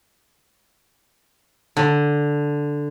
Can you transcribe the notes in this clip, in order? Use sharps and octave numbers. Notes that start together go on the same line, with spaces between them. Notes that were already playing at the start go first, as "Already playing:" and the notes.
D3